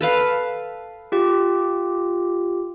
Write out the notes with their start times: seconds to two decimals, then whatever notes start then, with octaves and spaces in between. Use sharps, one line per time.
0.01 A4 B4 F5
1.12 F4 G4